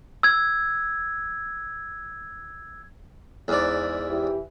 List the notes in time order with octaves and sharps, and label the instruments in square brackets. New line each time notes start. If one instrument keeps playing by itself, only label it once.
[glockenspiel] E6 G#6
[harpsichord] E2 G#2 D5
[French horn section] E3 G4